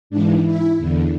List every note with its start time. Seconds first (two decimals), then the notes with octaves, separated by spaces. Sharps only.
0.10 G#2 E3 D4
0.44 E4
0.78 E2 D3